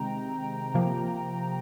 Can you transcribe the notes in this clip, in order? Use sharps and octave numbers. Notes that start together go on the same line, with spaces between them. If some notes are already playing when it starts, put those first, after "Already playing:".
Already playing: C3 D#3 G#3 C4 G5 A#5
C3 F3 A#3